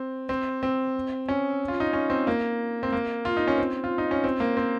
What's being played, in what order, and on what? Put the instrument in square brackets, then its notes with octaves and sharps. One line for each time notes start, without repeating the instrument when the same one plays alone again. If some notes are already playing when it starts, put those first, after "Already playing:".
Already playing: [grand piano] C4
C4
C4
C#4
F4
D#4
C#4
C4
A#3
C4
A#3
F4
D#4
C#4
C4
F4
D#4
C#4
C4
A#3
C4